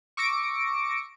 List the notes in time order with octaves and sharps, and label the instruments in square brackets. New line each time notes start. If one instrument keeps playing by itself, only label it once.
[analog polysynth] C#6 D6 E6 A#6 C#7 D7